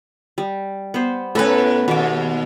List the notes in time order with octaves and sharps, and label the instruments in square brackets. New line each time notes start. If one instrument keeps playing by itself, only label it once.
[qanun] G3
B3 C5
[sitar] A2 B4 [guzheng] A3 B3 [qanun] C#4 A4
[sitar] D#2 [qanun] B2 D6